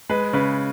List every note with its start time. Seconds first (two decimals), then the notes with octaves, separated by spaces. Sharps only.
0.10 G#3 B4
0.33 C#3 B4